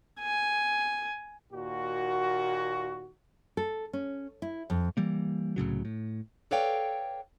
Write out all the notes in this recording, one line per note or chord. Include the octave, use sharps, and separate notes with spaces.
G#5
D#2 A#2 F#4
A4
C#4
E4
F2
E3 G3 A#3
C2 A2 C#3 F#3
A2
A4 B4 C#5 D5 F5 G5